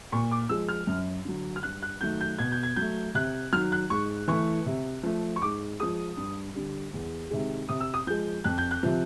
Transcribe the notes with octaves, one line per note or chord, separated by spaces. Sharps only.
A#2 C#6
D6
F3 G#3 E6
F6
F#2
D3 F#3
F6
G2 F#6
F#6
D#3 F#3 A3 G6
G6
B2 G#6
G6
G#6
F#3 A3 G6
C3 F#6
D#3 F#3 F6
F#6
G#2 C#6
E3 A3 C#6
C3
F3 A3
C#6
G#2 D6
F3 G#3 D#6
G2
D3 G3
E2
C3 D#3 G#3
C3 D#6
E6
D#6
F3 G#3 G6
F2 F#6
G6
F#6
C3 F3